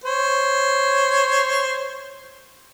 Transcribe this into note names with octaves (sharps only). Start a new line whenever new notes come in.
C5 C#5